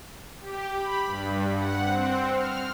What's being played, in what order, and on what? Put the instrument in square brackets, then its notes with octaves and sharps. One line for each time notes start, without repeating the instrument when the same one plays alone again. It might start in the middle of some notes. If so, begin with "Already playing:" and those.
[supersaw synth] G4
B5
G2
F#5
C4
F6